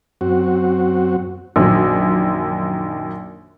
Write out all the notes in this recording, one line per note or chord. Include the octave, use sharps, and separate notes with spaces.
F#2 C4 F#4
A#1 F#2 D#3